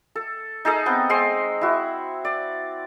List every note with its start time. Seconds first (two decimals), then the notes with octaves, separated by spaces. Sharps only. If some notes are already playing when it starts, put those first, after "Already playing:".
0.15 A4
0.65 D#4 G#4 A4 D#5
0.86 B3 C4 G5
1.10 G#3 C4 C6
1.61 E4 F#4
2.25 D5